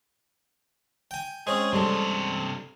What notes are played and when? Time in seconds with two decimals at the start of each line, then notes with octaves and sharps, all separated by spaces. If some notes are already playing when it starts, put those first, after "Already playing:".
1.11 G5 G#5
1.47 G#3 C4 C#4 G#4
1.73 G2 C3 G3 A4